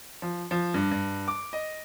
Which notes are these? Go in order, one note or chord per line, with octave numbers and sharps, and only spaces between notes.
F3
F3
G2
G2
D6
D#5